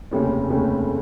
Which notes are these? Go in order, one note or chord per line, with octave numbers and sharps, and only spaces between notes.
F1 D#2 C#3 A3 C#4
F1 D#2 C#3 A3 C#4